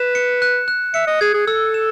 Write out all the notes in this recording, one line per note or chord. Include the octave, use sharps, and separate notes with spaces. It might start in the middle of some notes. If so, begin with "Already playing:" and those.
Already playing: B4 E7
C#7
F#6
F#6
E5 C#7
D#5
G#4 G#6
G#4
A4 E6
E7